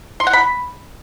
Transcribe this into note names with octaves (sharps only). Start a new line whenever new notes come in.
C6
F#5
B5